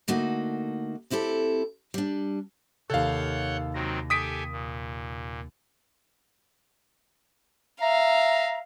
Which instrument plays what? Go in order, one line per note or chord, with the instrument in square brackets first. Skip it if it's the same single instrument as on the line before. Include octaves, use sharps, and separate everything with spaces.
[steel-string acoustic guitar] D3 A3 A#3 D#4 F#4
D2 C4 E4 G4 A4
G3 D4
[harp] D#2 C3 [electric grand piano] A4 F5 [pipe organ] C#5 F#5 G6
[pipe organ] D#3 F#3 C4 [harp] A#6 D#7
[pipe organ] G4 A4 G#5 [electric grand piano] D#6 B6 D7
[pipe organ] A#2
[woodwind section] E5 A#5 [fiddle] F5